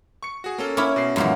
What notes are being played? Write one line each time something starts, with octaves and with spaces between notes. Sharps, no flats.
C#6 C#7
F#4 G#4
A#3 C#4 A4
C#4 E4 A#4 D6
B2 C7
F#2 A#2 D#3 E3 G#3